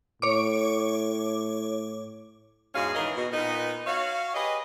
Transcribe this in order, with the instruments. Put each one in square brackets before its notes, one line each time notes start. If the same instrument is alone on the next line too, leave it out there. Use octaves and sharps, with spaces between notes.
[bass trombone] A2 [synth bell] C#5 D6
[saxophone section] E2 G#2 B2 C#4 G#4 F5
G#2 D#3 E3 G#4 A#4 D#5
B2
A#2 B3 D#4
F#4 C#5 F5
G4 G#4 B4 D#5